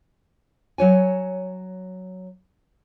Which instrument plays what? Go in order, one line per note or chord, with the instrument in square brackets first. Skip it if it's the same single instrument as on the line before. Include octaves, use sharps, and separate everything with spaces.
[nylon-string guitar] F#3 C#5 G#5